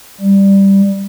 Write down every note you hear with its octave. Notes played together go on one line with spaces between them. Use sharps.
G3